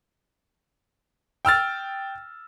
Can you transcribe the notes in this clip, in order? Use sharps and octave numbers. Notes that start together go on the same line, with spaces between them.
G5 E6 F6 A6